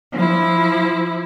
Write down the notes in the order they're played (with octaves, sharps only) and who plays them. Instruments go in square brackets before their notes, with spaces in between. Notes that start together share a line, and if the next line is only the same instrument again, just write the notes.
[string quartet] F3 E4